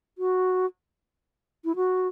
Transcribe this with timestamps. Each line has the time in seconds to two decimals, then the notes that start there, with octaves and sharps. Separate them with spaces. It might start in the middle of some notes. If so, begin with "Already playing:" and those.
0.18 F#4
1.65 E4
1.76 F#4